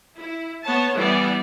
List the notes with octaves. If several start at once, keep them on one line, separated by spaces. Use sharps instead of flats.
E4
B3 C#5 A5
E3 G3 B3 D5